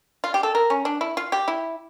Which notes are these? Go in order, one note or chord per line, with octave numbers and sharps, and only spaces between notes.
F4
G4
A4
A#4
C#4
D4
E4
F4
G4
E4